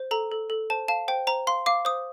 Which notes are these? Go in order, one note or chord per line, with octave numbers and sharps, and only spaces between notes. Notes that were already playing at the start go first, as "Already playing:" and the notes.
Already playing: C5
A4 A#5
A4
A4
C5 A5
F5 A5
C5 G5
C5 A#5
F5 C6
F5 D6
C5 D#6